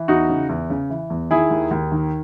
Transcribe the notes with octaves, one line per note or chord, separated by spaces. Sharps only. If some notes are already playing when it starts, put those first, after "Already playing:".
Already playing: E3
E2 D#4 F#4
C#3
E2
C#3
E3
E2
D#3 E4 G#4
D#2
D#2
D#3